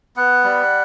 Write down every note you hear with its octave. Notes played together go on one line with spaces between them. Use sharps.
B3 F#5
G3